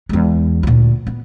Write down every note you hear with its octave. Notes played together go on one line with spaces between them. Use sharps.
E2 G#3
D2 A#2
B3